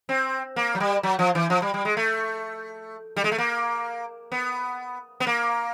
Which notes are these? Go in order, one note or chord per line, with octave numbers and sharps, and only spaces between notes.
C4
A#3
F#3
G3
F#3
F3
E3
F3
G3
G3
G#3
A3
G3
G#3
A3
A#3
B3
B3
A#3